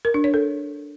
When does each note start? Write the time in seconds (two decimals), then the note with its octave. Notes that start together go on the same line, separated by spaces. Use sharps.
0.05 A#4
0.14 D4
0.24 C#5
0.34 A4